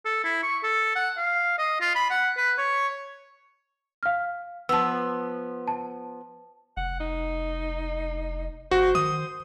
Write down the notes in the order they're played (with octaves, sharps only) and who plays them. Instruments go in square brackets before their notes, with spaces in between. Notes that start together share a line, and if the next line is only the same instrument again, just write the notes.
[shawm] A4
E4
C#6
A4
F#5
F5
D#5
F4
B5
F#5
B4
C#5
[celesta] F5 F6
[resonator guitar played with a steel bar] F3 B3 [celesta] A5 E6
[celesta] A5
[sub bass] F1 [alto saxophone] F#5
[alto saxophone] D#4
[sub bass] G1 [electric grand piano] F#4 [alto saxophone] C5
[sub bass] D#3 [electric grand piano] D#6